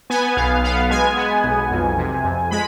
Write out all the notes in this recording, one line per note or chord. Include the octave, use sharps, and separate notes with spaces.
B3 G#5
B1 F5
B3 F5
G#3 G#5
B3
B1
F2
C3
F2
G#3 B5